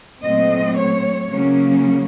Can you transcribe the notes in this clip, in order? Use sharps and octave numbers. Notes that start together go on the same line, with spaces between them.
A#2 F#3 A3 C4 D#5
C#5
C#3 F#3 A#3 C#4